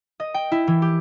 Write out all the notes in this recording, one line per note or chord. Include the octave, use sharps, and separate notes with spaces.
D#5
G5
E4
E3
G4